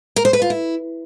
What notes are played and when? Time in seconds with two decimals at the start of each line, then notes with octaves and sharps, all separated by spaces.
0.16 A#4
0.25 C5
0.33 B4
0.42 F4
0.50 E4